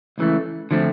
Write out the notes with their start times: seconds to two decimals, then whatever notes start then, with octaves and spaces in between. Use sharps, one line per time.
0.18 C#2 C#3 E3 A3
0.71 D3 F3 A3 C4